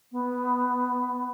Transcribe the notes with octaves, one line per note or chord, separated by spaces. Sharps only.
B3